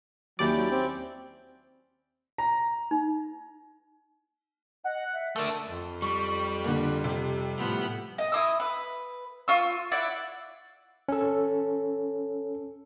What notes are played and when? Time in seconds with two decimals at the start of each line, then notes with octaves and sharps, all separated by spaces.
0.39 D#2 F#3 C#4 E4 G4 D5
0.56 F#3
0.71 C4
2.38 A#5
2.91 D#4
4.84 D#5 F#5
5.13 E5
5.36 A3 D4 A#4 E6
5.68 F2
6.02 G3 C#6
6.64 D3 A#3
7.04 C3
7.58 A2 F3 B3
8.18 D#5
8.32 E4 D#6 E6
8.60 B4
9.48 F4 C#6 E6
9.92 E4 D5 E5 F#5
11.09 C#4 A4